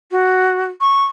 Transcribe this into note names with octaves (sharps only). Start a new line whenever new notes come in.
F#4
C#6